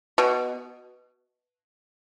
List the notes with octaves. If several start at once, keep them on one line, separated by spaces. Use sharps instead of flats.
B2